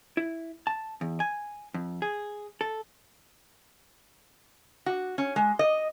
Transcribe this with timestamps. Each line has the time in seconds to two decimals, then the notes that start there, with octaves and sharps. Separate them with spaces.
0.17 E4
0.67 A5
1.01 E2
1.20 G#5
1.74 F2
2.02 G#4
2.61 A4
4.86 F#4
5.18 C#4
5.36 G#3
5.59 D#5